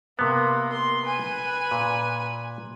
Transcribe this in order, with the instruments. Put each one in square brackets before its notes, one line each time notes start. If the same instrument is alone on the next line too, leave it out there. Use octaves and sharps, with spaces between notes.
[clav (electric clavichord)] C3 B3 [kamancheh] A#3
[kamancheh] C6
B4 G#5
[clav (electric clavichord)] A#2